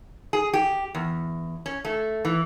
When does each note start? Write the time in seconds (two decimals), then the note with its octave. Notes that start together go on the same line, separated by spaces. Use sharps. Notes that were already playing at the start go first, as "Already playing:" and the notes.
0.33 G#4
0.53 G4
0.95 E2
1.66 C#4
1.85 A3
2.25 E3